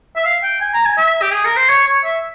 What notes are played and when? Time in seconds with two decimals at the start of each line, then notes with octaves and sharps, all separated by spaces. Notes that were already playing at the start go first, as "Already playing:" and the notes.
0.16 E5
0.25 F5
0.43 G5
0.61 G#5
0.74 A#5
0.85 G#5
0.97 E5
1.22 G4
1.33 G#4
1.45 A#4
1.57 C5
1.69 C#5
1.86 C#5
2.04 E5